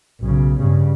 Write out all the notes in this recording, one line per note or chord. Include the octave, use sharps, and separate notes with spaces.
B1 C#3
G2 C#3